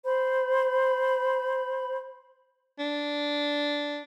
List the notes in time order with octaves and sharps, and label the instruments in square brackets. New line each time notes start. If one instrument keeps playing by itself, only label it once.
[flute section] C5 B5
[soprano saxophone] D4